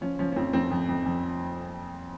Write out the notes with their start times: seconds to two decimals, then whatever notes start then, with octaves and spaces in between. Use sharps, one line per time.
0.01 F3 C#4
0.19 F3 C#4
0.32 C#4
0.36 F2 C4
0.53 F2 C4
0.71 F2
0.89 F2
1.06 F2